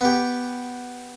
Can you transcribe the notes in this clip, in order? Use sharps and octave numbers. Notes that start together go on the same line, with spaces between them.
B3 G4